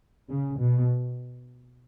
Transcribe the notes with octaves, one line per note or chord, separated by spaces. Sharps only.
C#3
B2